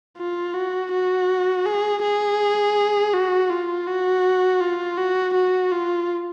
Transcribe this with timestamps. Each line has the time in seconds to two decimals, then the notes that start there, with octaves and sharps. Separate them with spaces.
0.18 F4
0.54 F#4
0.92 F#4
1.66 G#4
2.02 G#4
3.14 F#4
3.50 F4
3.88 F#4
4.61 F4
4.98 F#4
5.34 F#4
5.71 F4